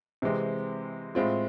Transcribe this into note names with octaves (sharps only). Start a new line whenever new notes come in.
C3 E3 G#3 C4
A2 G#3 C4 F4